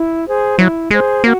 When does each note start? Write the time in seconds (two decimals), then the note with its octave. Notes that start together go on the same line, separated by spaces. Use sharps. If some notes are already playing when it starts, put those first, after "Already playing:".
Already playing: E4
0.27 G#4 C5
0.59 F#3 E4
0.90 G#3 G#4 C5
1.24 A#3 F#4